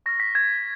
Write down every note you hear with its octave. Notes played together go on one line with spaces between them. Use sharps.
C#6 F6 A#6
B6
G#6